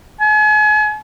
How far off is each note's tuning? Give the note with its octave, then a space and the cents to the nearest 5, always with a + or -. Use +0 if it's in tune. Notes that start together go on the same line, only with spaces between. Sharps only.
G#5 +40